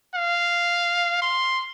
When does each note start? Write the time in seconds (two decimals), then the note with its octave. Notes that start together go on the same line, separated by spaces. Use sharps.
0.15 F5
1.22 C6